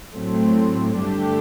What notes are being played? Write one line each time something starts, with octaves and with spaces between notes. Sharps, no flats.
A2 F#3 A3 C4
G2 D3 A3 D4 G4